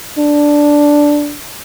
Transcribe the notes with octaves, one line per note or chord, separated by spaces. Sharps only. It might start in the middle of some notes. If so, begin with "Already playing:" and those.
D4